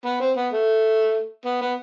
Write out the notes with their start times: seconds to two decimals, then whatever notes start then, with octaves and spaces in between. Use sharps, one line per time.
0.05 B3
0.21 C4
0.37 B3
0.52 A3
1.45 B3
1.61 B3